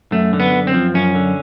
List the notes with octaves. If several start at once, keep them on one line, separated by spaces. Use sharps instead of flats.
F#2 A3
D3
B3
F#2
C4
F3
F#2 C#4
D3